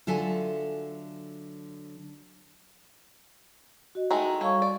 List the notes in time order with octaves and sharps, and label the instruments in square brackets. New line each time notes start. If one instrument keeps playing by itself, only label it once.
[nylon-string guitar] D3 F#3 F4 A4 E5 G#5
[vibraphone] F#4 D#5
[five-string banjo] D#3 G#3 A3
[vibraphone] G3 F5 C#6 [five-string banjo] A4 C#5
[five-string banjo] D5